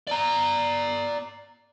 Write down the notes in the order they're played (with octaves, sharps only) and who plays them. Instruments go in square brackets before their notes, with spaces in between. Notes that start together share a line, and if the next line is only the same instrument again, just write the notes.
[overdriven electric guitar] D5 A#5